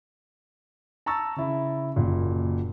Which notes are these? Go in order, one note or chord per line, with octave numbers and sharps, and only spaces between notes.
A5 A#5 C#6 E6 A6
C#3 E4
F#1 A#2